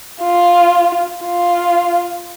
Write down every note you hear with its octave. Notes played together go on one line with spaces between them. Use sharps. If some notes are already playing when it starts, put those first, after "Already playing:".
F4
F4